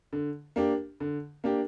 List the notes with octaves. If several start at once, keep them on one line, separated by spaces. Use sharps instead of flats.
D3
A#3 D4 G4
D3
A#3 D4 G4